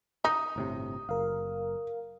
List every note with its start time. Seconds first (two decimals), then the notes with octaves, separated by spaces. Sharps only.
0.25 D#4 D#6
0.56 G1 A2 C3
1.09 F#1 A#4 F5